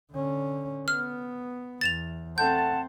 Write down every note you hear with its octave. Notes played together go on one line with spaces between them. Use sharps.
D3 C#4
B3 F6
E2 A6 E7 F7
A3 C4 F#5 A5 G6